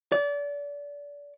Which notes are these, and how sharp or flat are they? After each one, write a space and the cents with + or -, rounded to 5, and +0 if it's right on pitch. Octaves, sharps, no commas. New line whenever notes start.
D5 -30